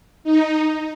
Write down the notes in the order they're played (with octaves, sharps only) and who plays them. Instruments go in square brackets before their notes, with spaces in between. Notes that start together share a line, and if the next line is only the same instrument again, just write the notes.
[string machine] D#4